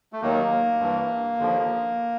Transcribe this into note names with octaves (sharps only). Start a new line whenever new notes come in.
A3
D#2 D#3 F#3 A#3
G2 E3
D#2 D3 F3